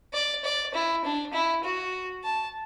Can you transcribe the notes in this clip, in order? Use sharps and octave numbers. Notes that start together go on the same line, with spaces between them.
D5
D5
E4
D4
E4
F#4
A5